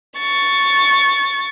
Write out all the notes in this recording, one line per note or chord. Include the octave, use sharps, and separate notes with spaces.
C#6 A6